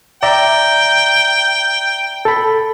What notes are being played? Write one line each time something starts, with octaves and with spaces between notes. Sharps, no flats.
D5 E5 G5 A#5
A4 B5